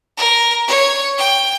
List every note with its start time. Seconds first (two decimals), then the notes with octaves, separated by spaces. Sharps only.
0.18 A#4
0.67 C#5
1.18 G5